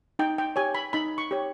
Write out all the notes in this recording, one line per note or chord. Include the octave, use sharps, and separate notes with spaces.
D#4 G5
G5
G4 C#5 G#5
B5
D#4 B5
C#6
G4 C#5